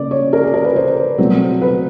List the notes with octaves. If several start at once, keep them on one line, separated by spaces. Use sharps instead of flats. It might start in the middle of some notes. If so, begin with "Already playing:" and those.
Already playing: C#3 A#3 D5
C#5
A#4
G#4
A#4
B4
C5
B2 F#3 A3 C4
B4